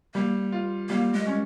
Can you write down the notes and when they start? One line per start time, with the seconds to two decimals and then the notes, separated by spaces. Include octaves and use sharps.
0.15 G3 A#3
0.52 F4
0.89 G3 A#3
1.13 G#3
1.27 C#4